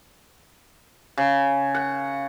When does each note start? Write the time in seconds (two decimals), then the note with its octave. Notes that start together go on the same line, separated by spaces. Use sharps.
1.18 C#3
1.75 F#5